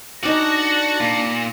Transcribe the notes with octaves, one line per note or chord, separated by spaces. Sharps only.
D4 D#4 F#4 D5 G#5 A#6 C#7
A#2